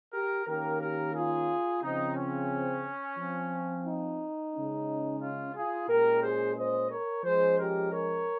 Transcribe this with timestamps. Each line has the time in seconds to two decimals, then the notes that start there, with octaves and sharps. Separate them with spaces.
0.13 G4 A#4
0.47 D#3 A#3 C#4 G4 A#4
0.80 G4 A#4
1.15 F4 G#4
1.82 C#3 F3 C4 D#4
2.16 C#4
3.18 F3 C4
3.86 D#4
4.53 C#3 G#3 C#4
5.20 C#4 F4
5.54 F4 G#4
5.89 A#2 G#3 C#4 G4 A#4
6.22 G#4 C5
6.56 C5 D#5
6.90 A#4 C#5
7.24 F3 G#3 C#4 G#4 C5
7.58 G4 A#4
7.92 A#4 C#5